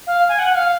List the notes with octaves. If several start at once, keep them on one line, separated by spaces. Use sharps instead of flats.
F5
G#5
F#5
F#5
F5